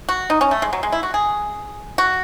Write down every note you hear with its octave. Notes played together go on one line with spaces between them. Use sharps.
F#4
D#4
C#4
A3
G#3
F#3
G#3
E4
F#4
G#4
F#4